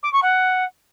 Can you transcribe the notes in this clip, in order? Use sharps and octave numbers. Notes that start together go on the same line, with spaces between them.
D6
C#6
F#5